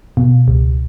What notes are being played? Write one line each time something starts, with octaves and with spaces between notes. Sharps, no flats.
B2
C#2